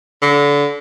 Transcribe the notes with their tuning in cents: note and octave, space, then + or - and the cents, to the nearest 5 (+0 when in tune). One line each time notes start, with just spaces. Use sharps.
D3 -30